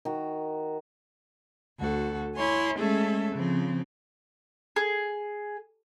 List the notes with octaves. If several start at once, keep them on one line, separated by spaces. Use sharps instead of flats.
D#3 F#4
D2 F#4 A4
E4 C#5 G#5 C6
G#3 A3 C#4 G#4 A4 E5
C#3 F3 C4
G#4